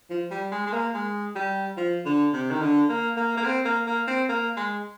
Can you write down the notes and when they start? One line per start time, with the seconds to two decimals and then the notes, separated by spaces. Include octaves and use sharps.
0.10 F3
0.31 G3
0.51 G#3
0.66 G#3
0.73 A#3
0.94 G#3
1.35 G3
1.77 F3
2.05 D3
2.33 C3
2.51 D#3
2.61 D3
2.89 A#3
3.17 A#3
3.37 A#3
3.45 C4
3.65 A#3
3.87 A#3
4.07 C4
4.29 A#3
4.57 G#3